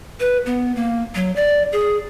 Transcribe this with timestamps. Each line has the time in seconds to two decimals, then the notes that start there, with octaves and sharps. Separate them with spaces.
0.20 B4
0.46 B3
0.75 A#3
1.15 F#3
1.36 D5
1.72 G#4